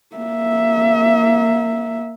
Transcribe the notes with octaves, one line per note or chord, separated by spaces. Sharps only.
A#3 E5